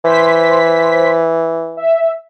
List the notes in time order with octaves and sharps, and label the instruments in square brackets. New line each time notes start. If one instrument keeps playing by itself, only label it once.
[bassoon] E3 [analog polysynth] C5 B6
[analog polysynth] E5